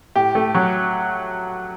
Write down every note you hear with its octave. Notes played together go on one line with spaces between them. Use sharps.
A2 G4
A3
F#3